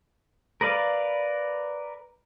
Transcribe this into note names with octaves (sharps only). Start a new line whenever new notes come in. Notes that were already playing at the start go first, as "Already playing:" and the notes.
A#4 B4 D5 F5